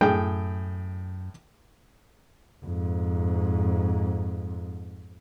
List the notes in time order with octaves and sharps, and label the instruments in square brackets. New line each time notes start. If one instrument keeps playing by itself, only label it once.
[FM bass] F#2 [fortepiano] A2 G#4 G5
[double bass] F2 G#2